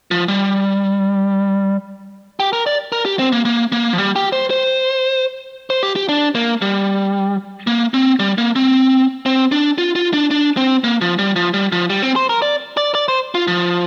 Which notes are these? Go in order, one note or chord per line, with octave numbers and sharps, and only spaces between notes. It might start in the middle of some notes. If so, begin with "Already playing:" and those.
F3
G3
G4
A#4
D5
A#4
G4
C4
A#3
A#3
A#3
F3
G3
G4
C5
C5
C5
G4
G4
D4
A#3
G3
A#3
C4
G3
A#3
C4
C4
D4
F4
F4
D4
D4
C4
A#3
F3
G3
F3
G3
F3
G3
C4
C5
A#4
D5
D5
D5
C5
F4
F3